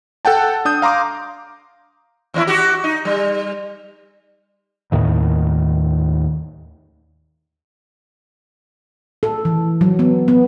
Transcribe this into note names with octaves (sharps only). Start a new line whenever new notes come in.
A4 F#5 G5 A5
D4 D#6 G6
F5 A#5 C6 D6
D#2 C#4 E4
F#4 G4
D#4
G3
D#2 A2 D#3
A4
E3
F#3
B3
B3